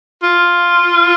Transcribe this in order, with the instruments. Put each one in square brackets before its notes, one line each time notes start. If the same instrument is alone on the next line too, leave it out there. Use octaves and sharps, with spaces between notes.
[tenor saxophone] F4